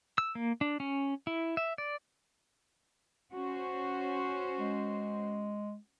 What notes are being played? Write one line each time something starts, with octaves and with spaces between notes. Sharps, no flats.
E6
A#3
D4
C#4
E4
E5
D5
C#4 F#4 C5
G#3